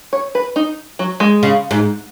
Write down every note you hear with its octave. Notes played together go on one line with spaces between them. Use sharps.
C#5
B4
D#4
F#3
G#3
C#3
G#2